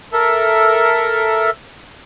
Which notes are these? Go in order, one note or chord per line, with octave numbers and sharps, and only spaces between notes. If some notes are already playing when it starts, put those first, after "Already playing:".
A4 A#4 E5